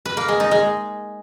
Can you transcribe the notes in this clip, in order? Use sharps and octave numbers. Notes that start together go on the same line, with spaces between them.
B4
A#3
G#3
D#4
G#3